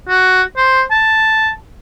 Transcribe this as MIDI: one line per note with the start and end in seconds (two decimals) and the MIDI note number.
0.09 0.43 66
0.57 0.82 72
0.91 1.50 81